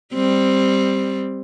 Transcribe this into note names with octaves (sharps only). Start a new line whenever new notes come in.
G3 C4